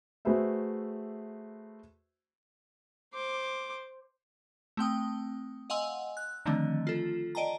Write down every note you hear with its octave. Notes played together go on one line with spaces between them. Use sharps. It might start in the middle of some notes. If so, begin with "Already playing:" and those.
A3 F#4 G#4 B4 C5 E5
C5 D6
A3 C4 G5 D#6
D#5 F5 F#5 G#5 C6 E6
F#6
D3 D#3 F3 A3 C4 D4
F4 A4
D5 D#5 G5 A5 A#5